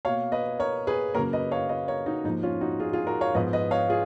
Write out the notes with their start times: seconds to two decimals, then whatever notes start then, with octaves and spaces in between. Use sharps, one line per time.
0.05 B2 A#3 C#5 F5
0.32 B4 D#5
0.59 A#4 C#5
0.87 G#4 B4
1.14 C#3 F#3 A#3 A#4 C#5
1.33 B4 D#5
1.51 C#5 F5
1.69 B4 D#5
1.88 A#4 C#5
2.06 D#4 F#4
2.25 G#2 F3 A#3 D#4
2.43 C#4 F4
2.61 D#4 F#4
2.80 F4 G#4
2.93 F4 G#4
3.07 F#4 A#4
3.21 C#5 F5
3.34 G#2 F3 B3 B4 D#5
3.53 B4 D#5
3.71 C#5 F5
3.89 F4 G#4